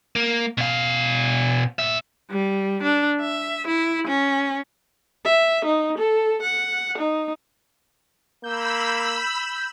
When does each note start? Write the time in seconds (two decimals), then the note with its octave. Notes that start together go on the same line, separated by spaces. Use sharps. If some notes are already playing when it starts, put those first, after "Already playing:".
0.16 A#3
0.58 B2 F5
1.79 A#2 E5
2.30 G3
2.83 D4
3.21 E5
3.67 E4
4.07 C#4
5.25 E5
5.65 D#4
5.99 A4
6.42 F#5
6.98 D#4
8.44 A#3 B5 E6 G6